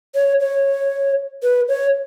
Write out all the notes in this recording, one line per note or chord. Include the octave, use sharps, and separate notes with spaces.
C#5
C#5
B4
C#5